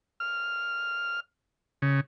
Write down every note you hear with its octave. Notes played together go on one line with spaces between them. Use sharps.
F6
C#3